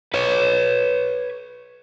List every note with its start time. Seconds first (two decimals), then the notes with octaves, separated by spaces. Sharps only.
0.14 B4 C#5